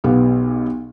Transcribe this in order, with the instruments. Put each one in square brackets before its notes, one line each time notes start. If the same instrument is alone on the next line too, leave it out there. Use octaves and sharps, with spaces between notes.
[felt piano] B1 B3 G4 F5